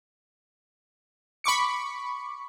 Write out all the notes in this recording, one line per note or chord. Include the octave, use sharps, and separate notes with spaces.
B5 C#6 D6 C#7